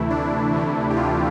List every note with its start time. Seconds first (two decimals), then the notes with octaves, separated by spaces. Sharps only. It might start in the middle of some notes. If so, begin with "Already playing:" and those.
Already playing: D2 C3 E3 A3 E4
0.10 D4
0.53 D2 C3 E3 A3 D4
0.90 G4
0.96 F4